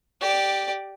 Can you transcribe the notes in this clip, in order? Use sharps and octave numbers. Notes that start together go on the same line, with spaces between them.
G4 D5